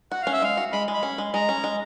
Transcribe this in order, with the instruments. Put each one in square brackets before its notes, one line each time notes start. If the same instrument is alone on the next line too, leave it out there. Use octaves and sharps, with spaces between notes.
[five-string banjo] F#4 [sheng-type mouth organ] F#5
[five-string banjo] C#4 [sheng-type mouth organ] F5
[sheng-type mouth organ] E5
[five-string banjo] G#3 [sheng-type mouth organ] F5
[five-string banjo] F#4
[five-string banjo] G#3 [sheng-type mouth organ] B5
[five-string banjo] G#3
[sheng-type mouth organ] B5
[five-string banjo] C#4
G#3
[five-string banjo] G#3 [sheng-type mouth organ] A#5
[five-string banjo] C#4
G#3